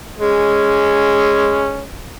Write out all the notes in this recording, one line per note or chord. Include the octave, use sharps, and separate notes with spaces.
G#3 C#4